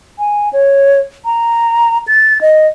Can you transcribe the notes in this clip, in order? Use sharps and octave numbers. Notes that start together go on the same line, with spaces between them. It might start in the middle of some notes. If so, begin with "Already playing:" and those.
G#5
C#5
A#5
A6
D#5